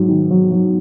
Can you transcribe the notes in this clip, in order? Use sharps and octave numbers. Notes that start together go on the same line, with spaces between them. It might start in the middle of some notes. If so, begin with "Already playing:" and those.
Already playing: G#2 F#3
D#3
F#3
F#3